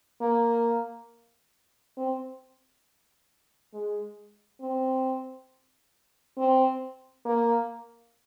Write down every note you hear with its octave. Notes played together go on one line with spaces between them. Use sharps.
A#3
C4
G#3
C4
C4
A#3